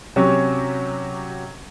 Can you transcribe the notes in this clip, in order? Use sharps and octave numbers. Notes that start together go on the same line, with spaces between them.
C3 F#3 C#4 F#4 G4